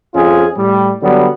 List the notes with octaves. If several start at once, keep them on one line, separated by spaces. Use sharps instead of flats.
F2 C#4 F4 G#4
A2 G3
D3 F#3 G3 B3